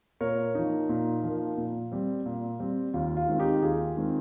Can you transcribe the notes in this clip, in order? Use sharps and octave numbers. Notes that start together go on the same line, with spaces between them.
A#2 A#4 C#5
F3 A#3 D#4
A#2
F3 A#3
A#2
G3 C4
A#2
G3 C4
D#2 F4
F4
D#3 G#3 C4
D#4 G4
D#2 F4 G#4
D#3 G#3 C4